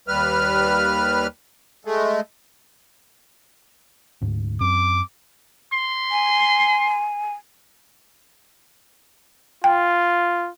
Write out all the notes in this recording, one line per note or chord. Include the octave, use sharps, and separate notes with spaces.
D#2 G3 B4 F6
G#3 A3
D2 G#2
F#2 C4 D6
C6
G#5
F4 G5